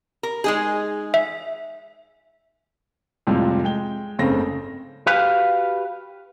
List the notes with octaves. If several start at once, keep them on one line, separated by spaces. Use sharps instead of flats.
A#4
G#3 D#4 G#4
E5
F2 A2 C3 F3 G3 G#3
G#3 G5 G7
F#1 G#2 C#3 A3 C4 A#6
F#4 G4 B4 F5